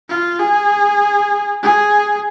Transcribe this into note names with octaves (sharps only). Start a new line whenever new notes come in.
F4
G#4
G#4